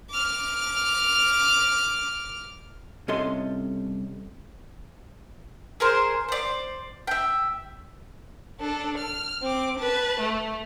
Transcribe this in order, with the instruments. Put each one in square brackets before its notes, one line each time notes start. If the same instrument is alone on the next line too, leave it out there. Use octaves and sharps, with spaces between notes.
[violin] D6 F6
[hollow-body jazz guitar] C2 C3 C#4 A4 D#5 C6
[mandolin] G#4 A#4 C5
C5 D5
E5 G5
[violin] D4 A4
F6
C4 D6
B4 A5
A3